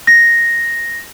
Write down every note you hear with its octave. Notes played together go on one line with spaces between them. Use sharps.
A#6